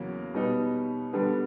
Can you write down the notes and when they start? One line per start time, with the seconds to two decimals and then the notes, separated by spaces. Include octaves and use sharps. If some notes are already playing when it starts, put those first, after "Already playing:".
Already playing: E2 C#3 F#3 A#3 C#4
0.34 B2 G3 B3 D#4
1.13 D3 G3 B3 D4